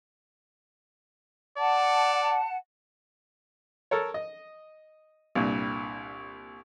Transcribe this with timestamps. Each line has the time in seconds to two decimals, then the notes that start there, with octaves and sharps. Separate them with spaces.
1.58 D5 F#5 A5
3.91 A4 A#4 C#5
4.14 D#5
5.35 C2 G2 A#2